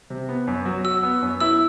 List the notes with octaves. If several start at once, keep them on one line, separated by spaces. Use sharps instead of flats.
C3
B3
F#2
F#3
F#4 E6
B3
F#2
E4 E6